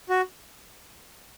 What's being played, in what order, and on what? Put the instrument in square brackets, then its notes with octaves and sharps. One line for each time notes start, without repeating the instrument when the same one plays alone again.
[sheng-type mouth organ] F#4